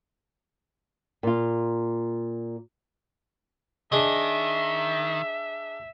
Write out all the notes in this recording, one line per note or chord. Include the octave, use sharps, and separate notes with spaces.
A#2 F4
D#3 D4 G#4 D#5 E5